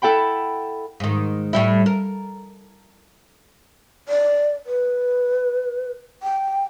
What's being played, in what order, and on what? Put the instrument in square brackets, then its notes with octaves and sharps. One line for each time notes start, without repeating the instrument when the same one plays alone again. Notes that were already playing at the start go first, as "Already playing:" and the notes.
[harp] E4 A4 F#5 G5 B5
[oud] G#2 D#3
A2 G3 E4
A#4
[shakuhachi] D5
B4
G5